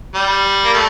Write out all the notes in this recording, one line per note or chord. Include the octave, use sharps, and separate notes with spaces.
G3
A#3
A3